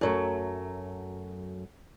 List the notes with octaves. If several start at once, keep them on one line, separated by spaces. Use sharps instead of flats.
F#2 F#3 A3